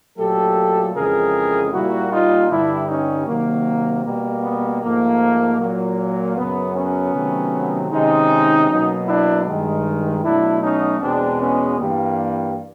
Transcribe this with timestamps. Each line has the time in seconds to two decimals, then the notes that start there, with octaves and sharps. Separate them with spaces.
0.18 A#2 F#3 A3 G4 A4
0.95 F2 C#3 E3 G#3 G#4 A#4
1.72 A#2 G3 A#3 E4 F#4
2.11 D#4 F4
2.50 G2 D3 G3 D4 E4
2.88 C#4 D#4
3.27 C3 D#3 F#3 A#3
4.05 B2 G3 A#3
4.43 B3
4.82 G#2 F3 A3 A#3
5.59 A#2 F#3 A#3
6.37 F#2 C#3 F#3 B3
6.75 B3 C#4
7.13 C3 D#3 F#3 A3
7.91 C3 D#3 G#3 C#4 D#4
8.68 B2 F#3 A#3
9.07 D4 E4
9.46 G2 D#3 G#3
10.23 B2 F#3 A3 D4 E4
10.62 C#4 D#4
11.01 E2 B2 G#3 C4 D4
11.39 B3 C#4
11.78 G2 E3 G3 A#3